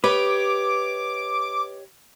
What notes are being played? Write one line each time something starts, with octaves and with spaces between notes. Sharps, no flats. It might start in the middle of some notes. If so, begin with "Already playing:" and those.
G4 B4 C#5 D#5 D6